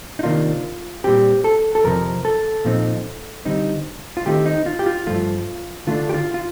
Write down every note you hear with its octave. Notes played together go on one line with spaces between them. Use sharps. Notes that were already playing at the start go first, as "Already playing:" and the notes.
D#4
C3 D#3 A#3 D4 F4
A#2 G3 C4 G4
A4
A4
F2 C3 F3 A#4
A4
A#2 F3 C4 D#4
D3 G3 C4 D#4
F4
D#3 A3 C4 D#4 G4
D#4
F4
G4
F4
G2 F3 A3 F4
D3 A3 D4 F4
G4
F4
F4